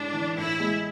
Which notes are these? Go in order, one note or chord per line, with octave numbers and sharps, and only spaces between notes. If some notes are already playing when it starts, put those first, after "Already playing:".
Already playing: A2 G#3 D4
E3
A2 E4
G#3